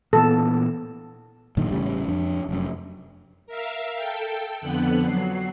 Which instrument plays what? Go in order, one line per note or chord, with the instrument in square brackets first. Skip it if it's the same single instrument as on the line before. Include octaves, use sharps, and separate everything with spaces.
[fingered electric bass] A#2 E3 B3 [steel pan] A4
[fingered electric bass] F#2 A#2 D3 D#3
A1 C#3 G3
F2 D4
F1 F#2
[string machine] A#4 E5 F5
A4 G5
F2 D3 B3 F#6
F#3 C7